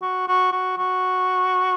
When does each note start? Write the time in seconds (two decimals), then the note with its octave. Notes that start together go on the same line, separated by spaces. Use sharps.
0.02 F#4
0.28 F#4
0.52 F#4
0.77 F#4